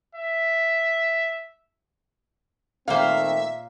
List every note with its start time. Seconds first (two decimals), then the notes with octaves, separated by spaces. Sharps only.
0.15 E5
2.88 A#2 D#3 A3 A#3 C4 C5 E5 F5